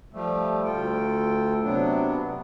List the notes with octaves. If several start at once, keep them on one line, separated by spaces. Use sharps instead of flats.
F3 G3 A3
D2 F4 A4 G5
C3 F#3 B3 D4